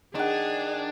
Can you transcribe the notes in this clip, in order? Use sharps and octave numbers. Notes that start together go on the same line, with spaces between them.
D#3 D4 G#4 F#5